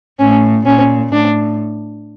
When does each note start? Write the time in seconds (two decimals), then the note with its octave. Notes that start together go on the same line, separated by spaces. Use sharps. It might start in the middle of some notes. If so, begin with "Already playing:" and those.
0.19 A2 C#4
0.66 A#2 C#4
1.13 A2 D4